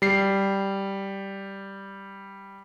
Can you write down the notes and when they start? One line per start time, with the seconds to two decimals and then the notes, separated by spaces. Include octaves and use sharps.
0.02 G3 C7